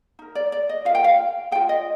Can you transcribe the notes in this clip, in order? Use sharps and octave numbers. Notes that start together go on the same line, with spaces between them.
D#4 A#4
D5
D5
D#5
F4 A#4 F5 G5
F5
F4 G#4 G5
D#5